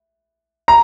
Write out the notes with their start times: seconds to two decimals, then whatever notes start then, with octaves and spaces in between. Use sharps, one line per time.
0.68 A#5